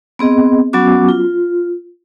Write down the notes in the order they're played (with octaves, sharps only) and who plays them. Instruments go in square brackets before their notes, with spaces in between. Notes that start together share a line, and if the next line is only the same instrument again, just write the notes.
[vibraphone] B3 C4 G#4 D#5
F#3 B3 C#4 F#4 D6
F4